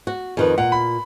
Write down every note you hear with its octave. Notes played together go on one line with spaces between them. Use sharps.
F#4
F2 D#3 B4
A#2 F#5
B5